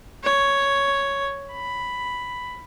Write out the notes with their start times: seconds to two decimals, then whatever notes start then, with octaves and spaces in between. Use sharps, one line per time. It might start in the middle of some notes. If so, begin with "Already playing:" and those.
0.24 C#5
1.52 B5